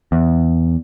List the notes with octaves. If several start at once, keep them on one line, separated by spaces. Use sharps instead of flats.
E2